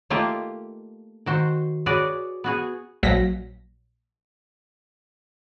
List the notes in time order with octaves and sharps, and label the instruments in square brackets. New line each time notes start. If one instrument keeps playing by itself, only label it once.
[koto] A3 A#3 D#4 F4 G4
D#3 F#4 C5
F#4 G#4 B4 C#5 D5
B3 F#4 G#4
[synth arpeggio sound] A#1 F#3 A#6 B6